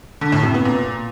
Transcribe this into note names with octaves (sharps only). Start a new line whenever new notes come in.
D3
A2
C3
B3
A#2